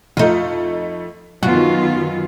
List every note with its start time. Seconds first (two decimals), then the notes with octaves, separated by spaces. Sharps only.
0.17 F2 A3 D#4 F4
1.43 F#2 D#3 B3 F4 F#4